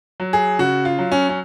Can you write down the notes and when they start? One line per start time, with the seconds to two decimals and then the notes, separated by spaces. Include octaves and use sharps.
0.20 F#3
0.33 G#4
0.59 C#3 F#4
0.85 F4
0.99 F#3
1.12 C#4
1.29 C#4